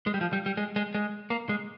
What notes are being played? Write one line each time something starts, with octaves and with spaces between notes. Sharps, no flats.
G#3
G3
F3
G3
G3
G#3
G#3
G#3
A#3
G#3